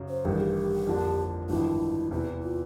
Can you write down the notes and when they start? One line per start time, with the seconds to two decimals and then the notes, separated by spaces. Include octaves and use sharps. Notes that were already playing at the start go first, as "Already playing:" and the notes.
Already playing: F#2 C#3 F#3
0.09 C5
0.24 A1 G2 D#3 G3 G#4
0.40 G4
0.87 F2 D3 F3 A#3 D4
1.49 G#1 G2 D3 F3 E4
2.11 E2 C3 E3 E4
2.43 F4